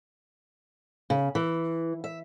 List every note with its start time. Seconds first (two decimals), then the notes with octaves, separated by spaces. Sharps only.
1.10 C#3
1.35 E3
2.04 E5